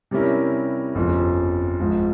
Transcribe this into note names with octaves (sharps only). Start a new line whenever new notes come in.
C3 G3 C#4 E4 A#4
G1 F2 C#3 F3
G#1 G#2 F3 G#3